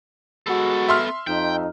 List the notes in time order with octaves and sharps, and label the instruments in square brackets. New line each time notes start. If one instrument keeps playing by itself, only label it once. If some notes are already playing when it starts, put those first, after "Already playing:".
[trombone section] G#3 F#4 [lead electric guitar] B3 A4
[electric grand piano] E5 C6 F6
[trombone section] F2 D#4 [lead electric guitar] G5